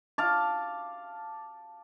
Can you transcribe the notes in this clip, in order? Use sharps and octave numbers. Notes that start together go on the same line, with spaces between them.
F5 A5 D6